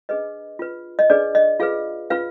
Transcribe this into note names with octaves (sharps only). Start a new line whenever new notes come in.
D4 G#4 B4 D#5
F4 B4
D#5
D4 G#4 B4 D5
D#5
F4 G#4 B4 F5
F4 B4 F5